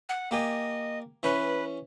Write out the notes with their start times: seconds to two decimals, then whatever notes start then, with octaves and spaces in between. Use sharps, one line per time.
0.09 F#5
0.31 A#3 G4 D#5 G#5
1.23 E3 C#4 B4